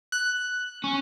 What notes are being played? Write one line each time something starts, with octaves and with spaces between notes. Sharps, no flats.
F#6
C#4